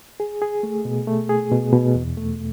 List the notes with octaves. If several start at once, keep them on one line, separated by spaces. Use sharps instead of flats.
G#4
G#4
A3
B2
A3
G#4
B2
B2
E2
A3